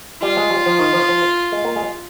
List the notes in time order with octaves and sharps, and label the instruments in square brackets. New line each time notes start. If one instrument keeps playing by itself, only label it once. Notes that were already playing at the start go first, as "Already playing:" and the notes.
[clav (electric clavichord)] G3 [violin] F4
[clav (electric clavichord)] G#3
G3
F3
D#3
F3
F3
G#3
A#3
G#3